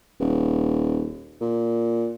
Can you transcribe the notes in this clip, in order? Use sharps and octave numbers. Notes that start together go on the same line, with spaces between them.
D#1
A#2